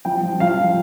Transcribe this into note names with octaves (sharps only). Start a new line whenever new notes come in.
F3 G5
F3
F3 F5
F3